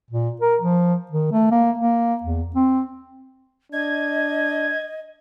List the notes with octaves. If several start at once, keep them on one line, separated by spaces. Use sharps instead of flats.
A#2
A#4
F3
D#3
A3
A#3
A#3
E2
C4
D4 D#5 G#6